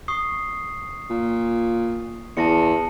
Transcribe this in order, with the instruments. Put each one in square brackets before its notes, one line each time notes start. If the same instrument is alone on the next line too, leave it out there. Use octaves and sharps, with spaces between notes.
[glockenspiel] C#6 D#6 C7
[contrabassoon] A#2
[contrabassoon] E2 [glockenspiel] A5 A#6 C#7